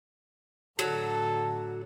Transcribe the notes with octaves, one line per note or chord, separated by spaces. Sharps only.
A2 D3 F#3 A4